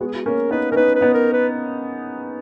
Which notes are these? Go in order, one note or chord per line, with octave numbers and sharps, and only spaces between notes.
G#3 B3 F#4
G#4
F#4
A#3 C#4 A#4
B3 D#4 B4
C#4 A#4
B3 D#4 B4
B4
B3 D#4
A#4
B4